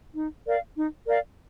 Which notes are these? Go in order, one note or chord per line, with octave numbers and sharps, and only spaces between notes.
D#4
A#4 D5 F5
D#4
A#4 D5 F5